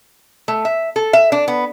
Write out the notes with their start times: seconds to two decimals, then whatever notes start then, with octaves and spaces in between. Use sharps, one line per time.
0.48 A3
0.65 E5
0.96 A4
1.13 E5
1.32 D4
1.48 B3